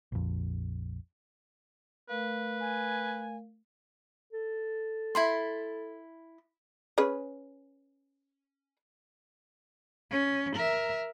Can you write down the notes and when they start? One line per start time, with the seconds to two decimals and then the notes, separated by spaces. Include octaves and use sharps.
0.12 A#1 F2
2.09 A3 A#4 B4 F5
2.60 G#5
4.33 A4
5.15 E4 B5 C6
6.98 C#4 G#4 B4
10.11 C#4
10.56 A#4 E5